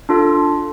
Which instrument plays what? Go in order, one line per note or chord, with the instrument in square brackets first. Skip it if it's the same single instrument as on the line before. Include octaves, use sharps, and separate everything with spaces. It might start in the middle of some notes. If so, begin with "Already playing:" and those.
[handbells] D4 F4 A4